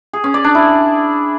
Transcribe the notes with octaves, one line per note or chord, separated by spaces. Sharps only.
G#4
C#4
D5
D4
E4